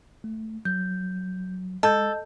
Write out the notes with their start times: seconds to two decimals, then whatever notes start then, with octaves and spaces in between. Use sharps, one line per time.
0.24 A3
0.65 F#3 G6
1.83 G#3 A4 D#5 A5 G6